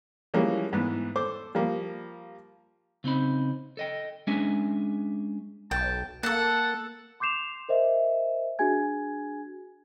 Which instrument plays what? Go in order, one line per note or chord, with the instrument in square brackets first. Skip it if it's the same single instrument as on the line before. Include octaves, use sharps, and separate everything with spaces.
[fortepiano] E3 F3 G3 G#3 A#3 C#4
G#2 E3 B3
A4 C5 D6
F3 G3 A#3
[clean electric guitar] C#3 C4 D#4 B5
A4 D#5 G5
G#3 C#4 D4 G#4 E5 G#5
[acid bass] B1 [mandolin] G5 [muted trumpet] A5
[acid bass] A#3 [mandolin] A4 A5 [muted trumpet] F#5
[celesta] C6 D6 G6 C7 E7 F7
A#4 C5 D#5 E5
D4 F#4 G#4 G#5 G#6